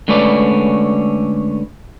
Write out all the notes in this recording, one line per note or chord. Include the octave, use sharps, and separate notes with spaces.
D3 G#3 A3 C#4 B4 D5